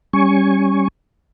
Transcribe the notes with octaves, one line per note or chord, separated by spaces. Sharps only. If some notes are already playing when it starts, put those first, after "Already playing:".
G3 C#4 G#5 C#6